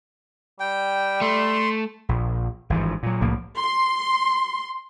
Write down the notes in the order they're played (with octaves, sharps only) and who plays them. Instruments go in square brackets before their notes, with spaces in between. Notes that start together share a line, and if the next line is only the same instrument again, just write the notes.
[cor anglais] G3 [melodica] G5
[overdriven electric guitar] A3 [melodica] C6
[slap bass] A#1
G#1 G2 E3 F3
A#2 F#3
C2 A2 F3 A#3
[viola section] C6